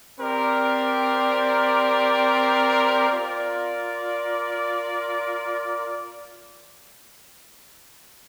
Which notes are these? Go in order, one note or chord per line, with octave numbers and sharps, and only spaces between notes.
C4 G4 A#4 D5
F4 A#4 D5